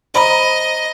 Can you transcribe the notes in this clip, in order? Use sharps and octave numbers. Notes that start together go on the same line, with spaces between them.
C5 D#5 A#5 B5